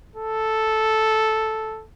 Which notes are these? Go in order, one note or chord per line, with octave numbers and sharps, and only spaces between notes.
A4